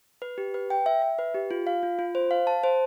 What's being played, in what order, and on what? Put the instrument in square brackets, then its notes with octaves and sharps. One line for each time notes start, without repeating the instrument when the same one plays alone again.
[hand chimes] B4
G4
B4
G5
E5
E5
B4
G4
F4
F5
F4
F4
C5
F5
A5
C5